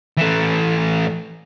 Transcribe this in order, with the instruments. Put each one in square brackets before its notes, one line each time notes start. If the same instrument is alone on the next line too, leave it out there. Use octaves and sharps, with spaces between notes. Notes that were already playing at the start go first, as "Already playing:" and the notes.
[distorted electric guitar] E3 A3